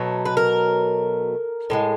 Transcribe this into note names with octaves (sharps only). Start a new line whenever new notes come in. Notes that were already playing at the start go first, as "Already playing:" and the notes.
Already playing: B2 F#3 A3
B4
A#4
A2 F3 G#3